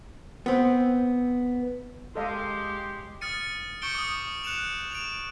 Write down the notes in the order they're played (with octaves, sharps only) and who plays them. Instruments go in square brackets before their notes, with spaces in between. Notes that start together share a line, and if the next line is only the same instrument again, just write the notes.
[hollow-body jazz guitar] B3 C4
[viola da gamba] G#3 [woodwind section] G4 C6 [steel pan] A4 D#5 F5
[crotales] D#6 F6 A6 C#7 D#7
C#6 G6 C#7 D7 G7
D6 D#6
F#6 C#7 E7 F7
D7 E7 F7